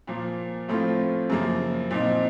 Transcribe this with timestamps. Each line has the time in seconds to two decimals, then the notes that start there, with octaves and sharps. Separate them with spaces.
0.07 A#2 F3 A#3
0.69 A2 F3 A3 C4 F4
1.30 F#2 C#3 F3 A#3
1.91 A#2 F3 C4 D#4